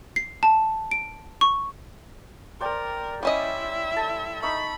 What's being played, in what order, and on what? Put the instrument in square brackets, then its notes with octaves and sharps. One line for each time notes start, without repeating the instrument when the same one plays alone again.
[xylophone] C7
A5
D7
C#6
[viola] A#4 [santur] C5 D5 G5
[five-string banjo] G3 C#4 D#5 [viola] E4 E5
[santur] A4 A5
[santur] D#4 E5 C#6 [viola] B5